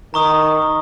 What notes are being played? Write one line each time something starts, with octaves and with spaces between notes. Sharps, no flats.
D#3 A#5 C#6 D#6